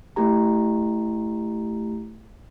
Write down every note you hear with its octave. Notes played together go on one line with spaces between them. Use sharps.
A3 E4 G4 A#5